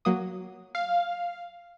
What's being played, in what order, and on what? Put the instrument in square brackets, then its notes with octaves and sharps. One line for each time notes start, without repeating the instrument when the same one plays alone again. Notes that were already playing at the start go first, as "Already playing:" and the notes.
[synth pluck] F#3 A#3 D#6
[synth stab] F5